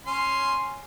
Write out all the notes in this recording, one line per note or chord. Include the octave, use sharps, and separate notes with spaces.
C#4 C6